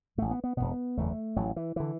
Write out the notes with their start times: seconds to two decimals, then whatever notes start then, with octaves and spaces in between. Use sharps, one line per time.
0.17 A1 A2 A3
0.31 B3
0.44 B3
0.57 E1 E2 B2 B3
0.97 F#1 E2 D3 A3
1.36 A1 A2 F#3
1.56 E3
1.76 D3 E3